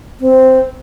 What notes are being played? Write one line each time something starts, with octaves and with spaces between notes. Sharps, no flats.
C4